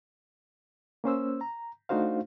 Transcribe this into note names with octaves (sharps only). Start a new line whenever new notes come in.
A#3 C#4 C5 E6
A#5
A3 D4 D#4 F#4 C5 F5